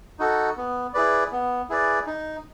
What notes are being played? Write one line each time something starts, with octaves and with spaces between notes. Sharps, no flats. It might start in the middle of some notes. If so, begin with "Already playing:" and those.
D#4 F#4 A4
B3
E4 G#4 B4 D5
B3
E4 G#4 B4 D5
D#4